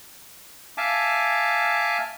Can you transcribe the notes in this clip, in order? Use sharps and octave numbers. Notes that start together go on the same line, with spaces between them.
E5 F5 G#5 A5 D6